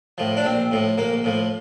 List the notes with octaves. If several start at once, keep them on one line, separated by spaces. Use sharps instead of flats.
A2 F3
D4
A#1 C4
A2 F3
A#1 A#3
A2 F3